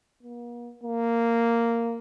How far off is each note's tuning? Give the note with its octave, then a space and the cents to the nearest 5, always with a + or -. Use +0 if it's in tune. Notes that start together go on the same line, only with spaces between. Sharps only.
A#3 +45
A#3 -10